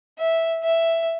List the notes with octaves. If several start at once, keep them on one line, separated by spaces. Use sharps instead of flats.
E5
E5